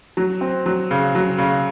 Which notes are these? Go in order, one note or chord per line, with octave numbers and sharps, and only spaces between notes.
F#3
C4
F#3
C#3
F#3
C#3